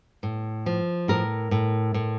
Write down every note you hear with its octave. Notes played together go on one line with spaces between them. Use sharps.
A2
F3
A2 A#4
A2
A2